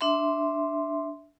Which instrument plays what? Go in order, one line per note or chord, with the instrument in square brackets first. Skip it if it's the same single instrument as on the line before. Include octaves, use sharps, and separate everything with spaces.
[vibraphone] D4 E5 C6